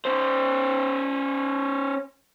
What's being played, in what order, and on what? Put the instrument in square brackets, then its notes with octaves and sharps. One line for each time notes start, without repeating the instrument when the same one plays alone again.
[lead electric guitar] C#4 C5